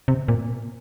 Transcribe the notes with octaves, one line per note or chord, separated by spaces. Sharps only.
C3
A#2